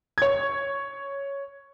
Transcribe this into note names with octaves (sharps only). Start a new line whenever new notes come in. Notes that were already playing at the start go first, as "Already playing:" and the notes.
C#5 G#6